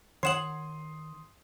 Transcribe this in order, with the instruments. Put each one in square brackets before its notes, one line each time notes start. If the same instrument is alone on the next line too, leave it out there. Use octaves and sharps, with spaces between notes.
[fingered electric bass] D#3 [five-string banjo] C#5 F#5 [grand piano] C6 D#6 [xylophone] C7 E7 F#7